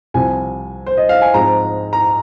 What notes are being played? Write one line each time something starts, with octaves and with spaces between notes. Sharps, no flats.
C2 C3 F3 G#5
C5
D#5
F5
G#5
G#2 F3 G#3 C4 A#5
A#5